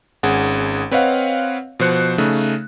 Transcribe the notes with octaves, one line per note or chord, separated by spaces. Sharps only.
G#1 C#4 G#4 F#5
C4 B4 C#5 D#5 F5 F#5
B2 F3 C5 F#6 C#7
C#3 A3 D#4